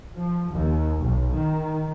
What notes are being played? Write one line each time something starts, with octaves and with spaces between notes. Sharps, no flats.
F3
D#2
B1
D#3